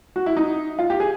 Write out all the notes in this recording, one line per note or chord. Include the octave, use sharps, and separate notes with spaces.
F#4
E4
D#4
F4
G4
G#4